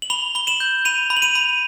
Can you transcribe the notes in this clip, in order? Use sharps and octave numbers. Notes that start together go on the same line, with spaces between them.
F#7
B5 F7 G7
B5 G7
E7 F#7
G6
B5 D#7 F7
B5
F#7
D#7 F7
B5